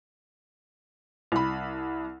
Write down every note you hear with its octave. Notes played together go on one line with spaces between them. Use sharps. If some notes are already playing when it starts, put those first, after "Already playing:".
C2 B5